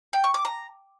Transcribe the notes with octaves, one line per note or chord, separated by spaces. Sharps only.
G5
C#6
D6
A#5